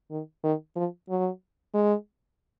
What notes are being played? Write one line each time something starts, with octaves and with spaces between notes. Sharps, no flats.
D#3
D#3
F3
F#3
G#3